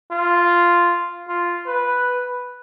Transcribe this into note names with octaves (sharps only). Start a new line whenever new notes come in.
F4
F4
B4